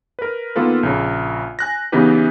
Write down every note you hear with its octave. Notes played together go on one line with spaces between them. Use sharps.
A#4 B4
D#3 A#3 B3 F4 A4 B4
A#1 C#3
G#5 F#6 A#6
C#3 E3 B3 D#4 G4 B4